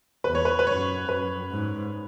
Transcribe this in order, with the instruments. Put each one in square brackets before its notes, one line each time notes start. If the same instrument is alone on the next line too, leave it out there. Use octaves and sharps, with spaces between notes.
[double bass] E2 [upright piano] B4
[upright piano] C#5
B4
B4
[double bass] F#2 [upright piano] C#5
[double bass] F#2 [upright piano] B4
[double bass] G#2